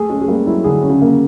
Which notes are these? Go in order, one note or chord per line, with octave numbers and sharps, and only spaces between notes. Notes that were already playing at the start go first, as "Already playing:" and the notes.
Already playing: A3 G#4
G#3 C#4
G#3
G3 A#3
F#3 E4
D3 G#4
C#4
C#3
A#3